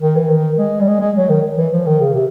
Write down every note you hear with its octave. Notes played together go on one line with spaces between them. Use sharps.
D#3
E3
D#3
G#3
G3
G#3
G#3
F#3
D#3
E3
F3
D#3
C#3
C3